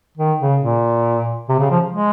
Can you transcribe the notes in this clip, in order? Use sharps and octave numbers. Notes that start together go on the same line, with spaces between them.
D#3
C#3
A#2
C3
C#3
F3
G#3